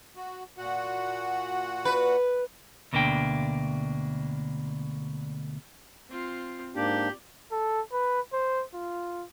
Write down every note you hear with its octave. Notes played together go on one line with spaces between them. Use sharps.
F#4
A#2 F#4 F#5
B4
D2 B2 A#3 D4 G5
C4 F4
G#2 A#3 D4 G4 D5
A4
B4
C5
F4